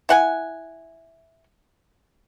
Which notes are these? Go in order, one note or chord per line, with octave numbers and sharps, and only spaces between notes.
E4 F#5 G#5